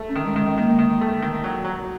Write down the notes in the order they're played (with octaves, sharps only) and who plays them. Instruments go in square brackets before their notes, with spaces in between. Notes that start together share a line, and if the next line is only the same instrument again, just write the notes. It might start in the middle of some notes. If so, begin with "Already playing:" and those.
Already playing: [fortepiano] A3
[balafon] C#4
[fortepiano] D#3
[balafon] G#3
[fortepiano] D#3
[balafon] G#3
[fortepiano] D#3 [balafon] A#3
[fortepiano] D#3
A3
D#3
F#3
F#3